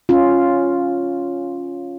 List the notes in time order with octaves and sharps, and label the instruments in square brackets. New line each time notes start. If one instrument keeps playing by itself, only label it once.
[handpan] C#4 F4